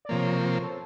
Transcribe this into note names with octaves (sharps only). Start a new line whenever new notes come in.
D5
C3 F3 A#3 C#5
C#5
C5
A4